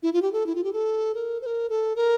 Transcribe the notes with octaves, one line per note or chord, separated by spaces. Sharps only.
E4
F4
G4
A4
E4
F4
G4
A4
A#4
C5
A#4
A4
A#4